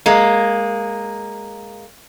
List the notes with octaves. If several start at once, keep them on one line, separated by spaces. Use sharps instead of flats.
G#3 A#3